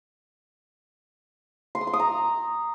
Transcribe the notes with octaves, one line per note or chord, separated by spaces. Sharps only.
C6
D#6
C6
D#6
A#5